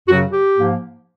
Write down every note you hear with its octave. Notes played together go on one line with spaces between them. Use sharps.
F#2 C#3 F#3 F#4
G4
G#2 F3 A#3